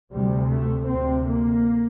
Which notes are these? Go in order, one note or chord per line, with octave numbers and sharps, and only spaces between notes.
D2 C3 G3
A3
D2 C3 C4
A#3